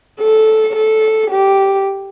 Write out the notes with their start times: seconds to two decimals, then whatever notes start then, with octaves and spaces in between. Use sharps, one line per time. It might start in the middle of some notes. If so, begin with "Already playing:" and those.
0.20 A4
0.75 A4
1.30 G4